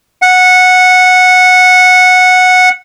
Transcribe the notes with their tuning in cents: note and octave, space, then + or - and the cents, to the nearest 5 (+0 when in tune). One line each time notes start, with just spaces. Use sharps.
F#5 -10